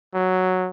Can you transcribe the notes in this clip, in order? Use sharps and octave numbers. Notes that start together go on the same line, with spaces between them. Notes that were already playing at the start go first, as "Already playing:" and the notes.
F#3